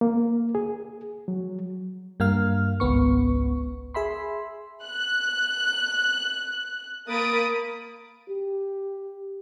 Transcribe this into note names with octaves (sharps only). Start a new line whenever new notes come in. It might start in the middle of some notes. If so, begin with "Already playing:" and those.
A#3
G#4
F#3
G2 A#3 F5 F6
G#1 C#2 B3 C#6
G#4 E5 B5 C6
F#6
A#3 A#4 B5 D#6 A6 D7
G4